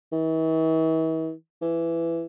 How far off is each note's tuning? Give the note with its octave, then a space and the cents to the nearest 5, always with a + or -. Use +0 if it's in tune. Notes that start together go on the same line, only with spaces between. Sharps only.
E3 -45
E3 +15